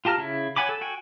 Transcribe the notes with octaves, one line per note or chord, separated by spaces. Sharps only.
F4 G4 A5 A#5 F6
C#3 E4
C#5 F#5 G#5 B5 D6
A4
F#4 G5 G#5